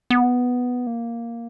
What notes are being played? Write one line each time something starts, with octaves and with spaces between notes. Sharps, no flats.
B3
A#3